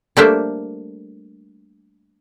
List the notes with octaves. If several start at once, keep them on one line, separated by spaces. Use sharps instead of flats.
G3 A3 A#3 D4 C5 E5